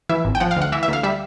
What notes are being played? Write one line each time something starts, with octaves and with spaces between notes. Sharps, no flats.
E3 E5
G#1
G5
F3 F#5
F5
D2
F#5
E3 E5
E5
D2 F5
G3 E5